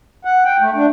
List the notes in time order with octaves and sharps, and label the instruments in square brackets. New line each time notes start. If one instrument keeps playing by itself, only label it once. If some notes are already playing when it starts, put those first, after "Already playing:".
[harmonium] F#5
G5
A3
D4